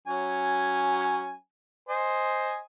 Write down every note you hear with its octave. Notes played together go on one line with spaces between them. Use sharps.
F#3 C#4 G#5
C5 D#5 G#5